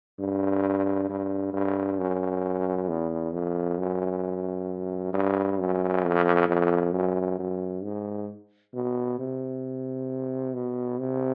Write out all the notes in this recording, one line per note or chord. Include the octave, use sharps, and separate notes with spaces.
G2
G2
G2
F#2
E2
F2
F#2
G2
F#2
F2
F2
F#2
F#2
G#2
B2
C3
B2
C3